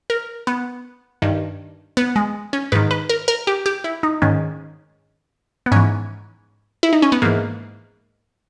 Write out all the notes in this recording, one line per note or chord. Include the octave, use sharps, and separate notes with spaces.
A#4
B3
G2 D#3
B3
G#3
C#4
G#2 D#3 B4
B4
A#4
A#4
G4
G4
E4
D#4
G#2 D#3 C#4
B3
G#2 E3 C#4
E4
D#4
C#4
B3
G#2 E3 A#3